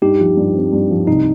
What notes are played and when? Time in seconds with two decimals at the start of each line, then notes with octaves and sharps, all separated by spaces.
0.02 G2 D#4 G4
0.19 F3
0.37 G2
0.55 C4
0.72 G2
0.90 F3
1.07 C2 D#4